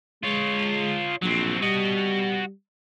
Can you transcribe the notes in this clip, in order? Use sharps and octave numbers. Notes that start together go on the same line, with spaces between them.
G#3 F4 C#5
A#1 F#3 C4
G3 F#4 D#5